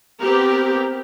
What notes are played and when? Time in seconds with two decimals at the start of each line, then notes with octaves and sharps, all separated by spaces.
0.21 B3 C4 G4 A#4